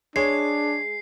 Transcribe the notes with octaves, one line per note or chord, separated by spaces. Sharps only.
G#3 D4 C#5 C7